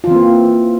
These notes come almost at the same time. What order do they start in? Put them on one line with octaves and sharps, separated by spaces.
F4 E3 C4 A#3